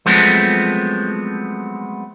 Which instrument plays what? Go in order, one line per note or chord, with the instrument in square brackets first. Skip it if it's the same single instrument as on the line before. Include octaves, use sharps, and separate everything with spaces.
[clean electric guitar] F3 F#3 G#3 A3 B3 C4